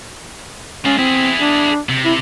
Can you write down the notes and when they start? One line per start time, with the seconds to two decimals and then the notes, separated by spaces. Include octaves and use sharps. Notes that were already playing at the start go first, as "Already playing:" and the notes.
0.85 G#3 C#4 F4
0.98 C4 E4 G#4
1.39 D4
1.89 C3
2.05 E4